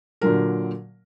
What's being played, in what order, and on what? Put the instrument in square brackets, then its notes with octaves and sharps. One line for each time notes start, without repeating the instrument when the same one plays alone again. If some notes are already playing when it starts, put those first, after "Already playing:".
[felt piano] A#2 D3 F#3 A#4